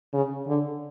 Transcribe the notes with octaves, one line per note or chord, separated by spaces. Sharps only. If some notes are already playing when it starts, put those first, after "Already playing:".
C#3
D3